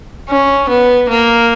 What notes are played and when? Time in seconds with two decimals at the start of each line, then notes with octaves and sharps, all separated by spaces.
0.29 C#4
0.69 B3
1.09 A#3